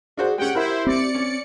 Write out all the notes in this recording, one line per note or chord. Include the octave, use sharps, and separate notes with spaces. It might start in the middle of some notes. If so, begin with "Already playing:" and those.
D4 F#4 G#4 C5
G#3 C#4 G4 F#5 G5
E4 A#4 C5 E5
C4 D5 C#7
C#4